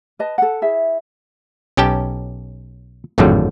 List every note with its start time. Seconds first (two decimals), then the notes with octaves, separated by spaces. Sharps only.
0.19 B4 D#5 A5
0.38 A4 F#5
0.62 E4 G#4 E5
1.77 B1 C#4 G4 G5 A5
3.18 G#1 F2 A2 D3 F#3 G3